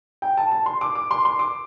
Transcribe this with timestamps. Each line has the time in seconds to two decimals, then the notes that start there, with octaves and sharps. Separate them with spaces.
0.22 G5
0.37 A5
0.51 A5
0.66 C6
0.81 D6
0.95 D6
1.11 C6
1.25 C6
1.39 D6